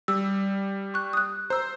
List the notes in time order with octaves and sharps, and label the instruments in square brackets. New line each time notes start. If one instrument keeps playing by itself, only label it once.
[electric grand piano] G3 [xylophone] E6
[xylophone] C#6 F#6
D#6 F#6
[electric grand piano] C5 [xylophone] A#5 E6